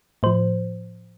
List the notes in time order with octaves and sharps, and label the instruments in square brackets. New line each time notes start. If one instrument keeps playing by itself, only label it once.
[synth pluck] A2 F3 C5